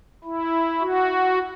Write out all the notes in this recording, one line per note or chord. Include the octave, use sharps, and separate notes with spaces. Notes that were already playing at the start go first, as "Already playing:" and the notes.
E4
F#4